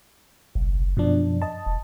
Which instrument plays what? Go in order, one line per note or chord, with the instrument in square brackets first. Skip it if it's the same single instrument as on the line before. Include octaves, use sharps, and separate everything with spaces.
[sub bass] F#1 [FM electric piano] B1
[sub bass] F#2 [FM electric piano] B2 F3 D4
[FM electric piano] D#5 A5
[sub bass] E1